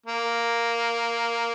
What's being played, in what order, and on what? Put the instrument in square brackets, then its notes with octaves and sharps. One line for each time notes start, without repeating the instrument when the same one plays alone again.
[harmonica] A#3